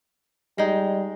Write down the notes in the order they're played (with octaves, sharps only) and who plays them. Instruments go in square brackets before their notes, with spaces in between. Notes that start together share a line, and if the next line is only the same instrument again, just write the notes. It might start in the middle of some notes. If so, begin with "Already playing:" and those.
[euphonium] G3 [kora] G#3 D#4